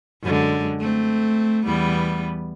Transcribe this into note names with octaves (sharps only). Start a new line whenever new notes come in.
F#2 D3 G#3
A3 C4
E2 G3 B3